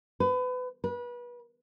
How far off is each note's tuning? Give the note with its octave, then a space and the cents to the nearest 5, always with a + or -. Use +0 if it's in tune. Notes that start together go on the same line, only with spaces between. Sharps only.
B4 +30
B4 -30